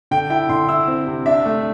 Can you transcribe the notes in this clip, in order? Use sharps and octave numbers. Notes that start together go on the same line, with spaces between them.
D3 G5
E4 G5
D3 C6
E4 E6
C4
C3
D4 E5
A3